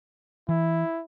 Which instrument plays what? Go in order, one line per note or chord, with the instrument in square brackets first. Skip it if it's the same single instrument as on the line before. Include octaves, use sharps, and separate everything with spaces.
[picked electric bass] E3 [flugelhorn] E4